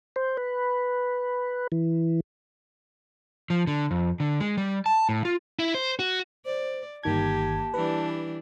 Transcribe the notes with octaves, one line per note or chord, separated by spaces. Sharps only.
C5
B4
E3
F3
D3
F2
D3
G#3
G3
A5
A2
F4
E4
C5
F#4
C5 D5
G1 D#3 A#3 G4 A5 G#6
E3 G3 D4 B4